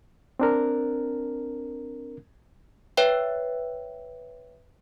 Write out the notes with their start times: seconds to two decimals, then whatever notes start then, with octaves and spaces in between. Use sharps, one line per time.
0.39 C4 D4 A#4
2.97 B4 C#5 E5 G5